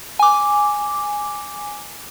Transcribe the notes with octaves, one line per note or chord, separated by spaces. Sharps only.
G#5 D6